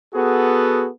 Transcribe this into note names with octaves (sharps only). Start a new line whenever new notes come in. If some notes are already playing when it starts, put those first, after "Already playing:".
B3 F#4 G#4 A4